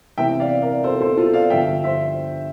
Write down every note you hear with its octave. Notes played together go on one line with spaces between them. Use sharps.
C2 C3 E3 E5 G5
D5 F5
A#4 D5
A4 C5
A4 C5
F4 A4
D5 F5
G2 D3 F3 E5 G5
C5 E5